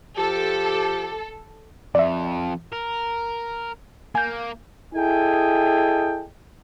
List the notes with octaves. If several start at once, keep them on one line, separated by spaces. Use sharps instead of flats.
F3 G4 A4
F2 D5 E5
A#4
A#3 G#5 G6
E4 G#4 A4 D#5 G5 G#5